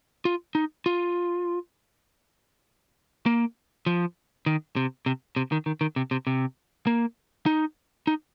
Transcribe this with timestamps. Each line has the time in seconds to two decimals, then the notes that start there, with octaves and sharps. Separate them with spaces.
0.25 F4
0.55 D#4
0.86 F4
3.26 A#3
3.86 F3
4.46 D#3
4.76 C3
5.06 C3
5.36 C3
5.52 D#3
5.66 D#3
5.81 D#3
5.96 C3
6.11 C3
6.27 C3
6.87 A#3
7.46 D#4
8.07 D#4